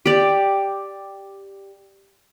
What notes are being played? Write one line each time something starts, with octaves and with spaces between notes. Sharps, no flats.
G4 D5